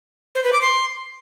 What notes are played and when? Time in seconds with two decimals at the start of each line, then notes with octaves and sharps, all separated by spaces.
0.35 C5
0.44 B4
0.53 D6
0.62 C6